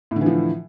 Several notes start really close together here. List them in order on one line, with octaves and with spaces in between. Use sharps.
A2 D3 E3 F3